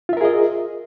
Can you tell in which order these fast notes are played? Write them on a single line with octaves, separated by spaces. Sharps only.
F4 E5 A#4 G#4 D#5